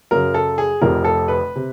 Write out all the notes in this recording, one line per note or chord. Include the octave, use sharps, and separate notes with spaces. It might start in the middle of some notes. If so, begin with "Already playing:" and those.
F#2 C#3 F#3 A#4
A4
G#4
F1 F2 C3 A#4
A4
B4
C3